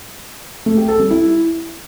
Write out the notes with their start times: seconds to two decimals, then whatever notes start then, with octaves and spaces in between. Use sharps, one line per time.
0.66 A3
0.77 G4
0.88 A4
0.99 G3
1.11 E4